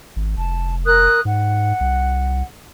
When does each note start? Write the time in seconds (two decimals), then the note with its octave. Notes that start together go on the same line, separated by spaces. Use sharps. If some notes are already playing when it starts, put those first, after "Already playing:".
0.16 G#1
0.37 F1 A5
0.85 A#4 D#6 F#6
1.25 G#2 F#5
1.80 C2